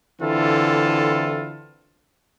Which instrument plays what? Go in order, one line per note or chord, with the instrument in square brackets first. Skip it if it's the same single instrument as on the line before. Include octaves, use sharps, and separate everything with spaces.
[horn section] D3 E3 C4 E4 F4 A4